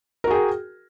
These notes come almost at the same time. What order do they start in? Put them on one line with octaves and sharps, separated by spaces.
A#4 F#4 G#4 G5